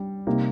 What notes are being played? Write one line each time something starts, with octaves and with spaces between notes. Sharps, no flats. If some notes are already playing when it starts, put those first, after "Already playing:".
Already playing: G3 D4 G4
C3 G3 A#3 D#4